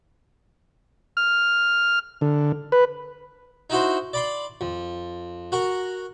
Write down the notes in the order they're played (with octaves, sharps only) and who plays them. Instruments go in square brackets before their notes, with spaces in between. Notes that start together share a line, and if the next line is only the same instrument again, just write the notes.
[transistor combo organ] F6
D3
B4
[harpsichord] D#4 E4 F#4 C5
D5 B5 C6
F2
F#4 A#4 F#5